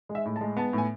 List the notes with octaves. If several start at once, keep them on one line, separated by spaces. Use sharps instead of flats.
G#3
E5
A2
A5
G#3
B3 A5
A2 G#5